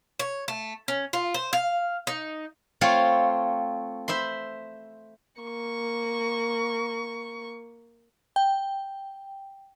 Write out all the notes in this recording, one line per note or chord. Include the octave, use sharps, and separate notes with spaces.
C#5
A3
C#4
F4
C5
F5
D#4
A3 C4 F4 C#5 F5
C5 E5 B5 C6
A#3 C#6
G5